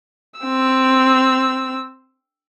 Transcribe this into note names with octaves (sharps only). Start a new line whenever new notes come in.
C4 E6